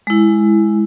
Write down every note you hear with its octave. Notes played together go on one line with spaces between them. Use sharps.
G#3 E4